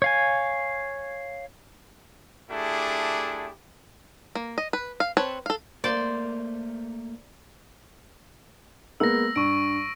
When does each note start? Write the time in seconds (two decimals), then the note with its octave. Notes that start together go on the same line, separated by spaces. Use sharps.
0.02 C#5 F5 G#5
2.51 A3 D4 E4 G4 G#4
4.35 A#3
4.58 D#5
4.73 B4
5.00 F5
5.17 C4 B4 C#5 A5
5.46 A4 F5
5.84 A3 A#3 A#4 C5 D5
9.00 G#3 A#3 B3 E6 A#6
9.36 G2 C#6 D7